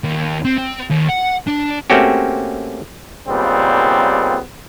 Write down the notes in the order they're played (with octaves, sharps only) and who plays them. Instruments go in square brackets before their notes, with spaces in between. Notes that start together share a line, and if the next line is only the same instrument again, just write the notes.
[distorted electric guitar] D#2
C4
C4
D#2
F#5
D4
[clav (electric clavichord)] A3 A#3 C4 C#4 F#4 G4
[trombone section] D#2 A#2 C#3 G3 B3 C4